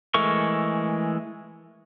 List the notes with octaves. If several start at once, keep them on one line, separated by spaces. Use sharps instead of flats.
E3 G#3 A3 A#4 C#6